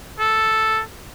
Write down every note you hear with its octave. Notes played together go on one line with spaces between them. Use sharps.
A4